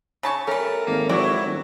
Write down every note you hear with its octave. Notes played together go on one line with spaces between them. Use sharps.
C#3 A5 C#6
G3 A3 C#4 A4 A#4
G#1 A#3
F3 F#3 E4 F#4 D5 G5 C#6
D#1